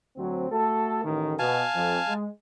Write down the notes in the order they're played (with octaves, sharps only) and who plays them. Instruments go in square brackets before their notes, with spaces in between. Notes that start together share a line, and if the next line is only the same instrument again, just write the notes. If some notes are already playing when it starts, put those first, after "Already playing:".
[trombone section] D2 F#3 C4
A3 F#4 A4
A1 D#3
[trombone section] B2 [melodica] F5 G#5 A5
[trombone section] F2
G#3